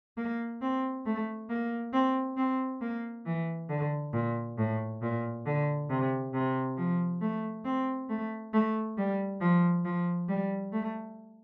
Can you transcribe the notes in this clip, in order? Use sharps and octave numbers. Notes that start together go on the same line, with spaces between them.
A#3
C4
A3
A#3
C4
C4
A#3
E3
D3
A#2
A2
A#2
D3
C3
C3
F3
A3
C4
A3
A3
G3
F3
F3
G3
A3